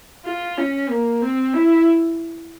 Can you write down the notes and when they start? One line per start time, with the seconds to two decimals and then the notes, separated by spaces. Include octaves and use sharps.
0.25 F4
0.57 C#4
0.89 A#3
1.22 C4
1.54 E4